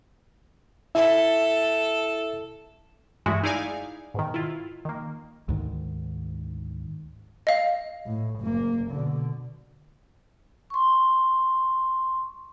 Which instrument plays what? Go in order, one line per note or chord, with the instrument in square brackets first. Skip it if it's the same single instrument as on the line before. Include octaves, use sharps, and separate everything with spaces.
[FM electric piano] E4 [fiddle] A4 [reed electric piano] E5
[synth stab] G2 E3 G#3 A3 E4 F#4
D#4 E4 G#4 D5 F5 G#5
G#2 B2 D#3
E4 F4
D#3 A#3
[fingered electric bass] D2 G#2 D#3
[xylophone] D#5 F5
[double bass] A2
F#1 A#3
B2 D3
[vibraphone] C6 C#6